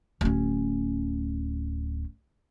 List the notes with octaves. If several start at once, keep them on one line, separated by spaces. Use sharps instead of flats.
D1 C#4